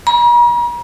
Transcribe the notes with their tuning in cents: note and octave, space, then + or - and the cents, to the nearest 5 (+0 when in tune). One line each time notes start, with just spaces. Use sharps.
A#5 +45